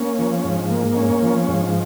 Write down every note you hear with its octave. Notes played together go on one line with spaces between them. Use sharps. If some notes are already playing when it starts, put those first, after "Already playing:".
Already playing: A#3 C#4
F3
G#2
A#3
C#4
F3
G#2